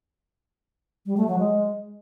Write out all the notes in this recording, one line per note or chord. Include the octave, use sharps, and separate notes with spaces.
G3
A3
F#3
G#3